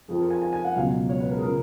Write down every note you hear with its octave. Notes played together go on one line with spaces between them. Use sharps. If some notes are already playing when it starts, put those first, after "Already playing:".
F2 F3 G#4
A#4
G#5
G#5
G#5
F#5
C#2 B2 F#3 F5
C#5
B4
A#4
G#4
C#3 F3 A#4